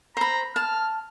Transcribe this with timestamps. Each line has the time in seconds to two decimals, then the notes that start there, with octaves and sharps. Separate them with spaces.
0.17 C5 A#5 B5
0.56 A5 F6